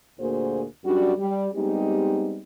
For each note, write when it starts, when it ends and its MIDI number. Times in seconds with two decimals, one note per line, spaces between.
0.20 0.64 38
0.20 0.64 46
0.20 0.64 58
0.20 0.64 66
0.20 0.64 68
0.20 0.64 72
0.85 1.13 42
0.85 1.13 55
0.85 1.13 62
0.85 1.13 66
1.18 1.49 55
1.55 2.41 55
1.55 2.41 56
1.55 2.41 59
1.55 2.41 60
1.55 2.41 63
1.55 2.41 67